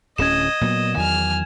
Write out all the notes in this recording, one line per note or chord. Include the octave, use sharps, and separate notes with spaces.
D1 D2 C#4 D#5 G#6 E7
A#2 F#3 B3
E2 D#3 F#3 G#5 F6